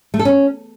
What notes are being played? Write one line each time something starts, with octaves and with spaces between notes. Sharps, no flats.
A3
A4
C#4